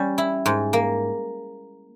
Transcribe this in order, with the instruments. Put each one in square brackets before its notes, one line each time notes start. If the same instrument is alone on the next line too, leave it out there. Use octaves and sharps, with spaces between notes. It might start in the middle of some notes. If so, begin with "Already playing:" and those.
Already playing: [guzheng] G3 C#4
E4
G#2
A#3